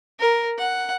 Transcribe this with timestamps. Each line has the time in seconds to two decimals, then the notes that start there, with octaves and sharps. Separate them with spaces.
0.19 A#4
0.58 F#5